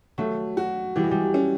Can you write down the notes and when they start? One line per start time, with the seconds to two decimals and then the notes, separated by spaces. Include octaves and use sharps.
0.18 F#3 A3
0.57 F#4
0.96 E3 G3
1.04 G#3
1.11 G3
1.34 C#4